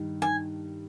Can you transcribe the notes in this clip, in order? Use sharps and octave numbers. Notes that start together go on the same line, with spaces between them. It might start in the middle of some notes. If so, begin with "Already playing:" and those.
Already playing: G2 D#3
D#3 G#5